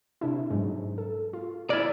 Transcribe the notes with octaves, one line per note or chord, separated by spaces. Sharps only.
C3 D4 E4
G#2 F#3
A4
F4
E4 D5 F6 G#6 A6